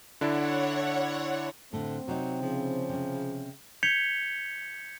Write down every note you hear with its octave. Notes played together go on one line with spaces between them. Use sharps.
D3 D4 E4 C#5 F#5
A2 D3 A3 C4
C3 F#3 D#4
C#3 F3
C3 C#4
G6 G#6 B6 C#7 F7 G7